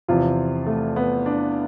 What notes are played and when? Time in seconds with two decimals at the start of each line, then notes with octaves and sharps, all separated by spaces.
0.08 E2 C3 F3 F4
0.66 A3
0.96 B3
1.26 D4